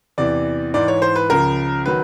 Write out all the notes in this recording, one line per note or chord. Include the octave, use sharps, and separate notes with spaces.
E2 C3 E3 D5
G#2 E3 D5
C#5
C5
B4
C#2 C#3 F3 A#4
D#3 F#3 B4